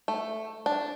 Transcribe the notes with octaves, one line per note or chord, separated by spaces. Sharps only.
A3
D4